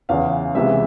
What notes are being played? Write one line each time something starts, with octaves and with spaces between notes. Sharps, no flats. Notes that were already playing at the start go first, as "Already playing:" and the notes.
E2 C#3 E3 F5
C#2 C3 E3 G#3 B3 E5